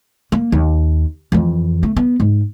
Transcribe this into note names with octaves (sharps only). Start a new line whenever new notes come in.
A#3
D#2
F2 E3
A3
B3
G#2